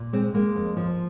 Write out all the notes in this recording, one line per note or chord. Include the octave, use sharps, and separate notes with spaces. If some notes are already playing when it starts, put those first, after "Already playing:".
Already playing: A#2
G#3 C4
G#3 A#3
F2
F3